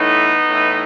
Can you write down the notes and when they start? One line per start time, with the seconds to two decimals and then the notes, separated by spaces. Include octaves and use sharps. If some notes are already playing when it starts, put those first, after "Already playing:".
Already playing: A2 E3 B3 D#4
0.48 A2 E3